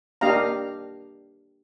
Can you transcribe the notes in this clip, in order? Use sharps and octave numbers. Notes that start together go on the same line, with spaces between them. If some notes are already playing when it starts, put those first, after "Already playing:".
A#3 D4 G4 D#5 F5 A#5